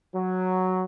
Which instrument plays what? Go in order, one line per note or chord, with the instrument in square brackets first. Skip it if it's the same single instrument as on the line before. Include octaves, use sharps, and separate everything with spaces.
[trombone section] F#3